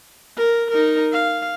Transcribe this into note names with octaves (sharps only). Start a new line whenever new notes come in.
A#4
D#4 A#4
F5